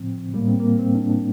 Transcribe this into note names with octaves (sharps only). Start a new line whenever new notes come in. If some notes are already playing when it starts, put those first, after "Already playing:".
Already playing: A2 F3 C4
A2 G3 A#3
C4
A#3
C4
D4
D4